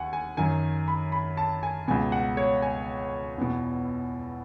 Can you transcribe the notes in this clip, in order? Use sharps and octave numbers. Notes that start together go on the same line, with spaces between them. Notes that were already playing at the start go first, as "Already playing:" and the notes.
Already playing: D#2 F#5 G#5
G#5
F#2 D#3 G#5
B5
B5
A5
G#5
C#2 B2 G#5
F#5
C#5
G#5
E2 B2